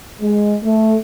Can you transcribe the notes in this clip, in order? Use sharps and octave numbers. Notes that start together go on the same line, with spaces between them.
G#3
A3